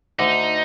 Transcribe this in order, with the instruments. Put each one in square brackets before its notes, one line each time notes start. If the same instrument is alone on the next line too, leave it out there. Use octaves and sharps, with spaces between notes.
[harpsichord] D2 D3 [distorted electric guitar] D#4